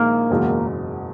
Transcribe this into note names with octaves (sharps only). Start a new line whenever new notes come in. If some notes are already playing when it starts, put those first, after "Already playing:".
Already playing: A#1 D#3 G#3 A#3
F#1 E2 B2 G#3